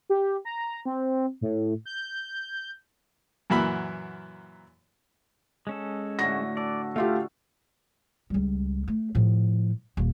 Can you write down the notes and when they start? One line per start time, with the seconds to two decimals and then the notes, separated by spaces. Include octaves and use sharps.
0.10 G4
0.45 A#5
0.85 C4
1.41 A2
1.85 G6
3.50 F#2 A#2 E3 E4 F#4 B5
5.67 G#3 C#4 A4
6.19 A2 D3 F#4 A#6
6.57 A4 D5
6.96 A3 F4 G4 F5
8.30 C#2 G3
8.88 A3
9.15 A2 F3
9.97 D#1 A#3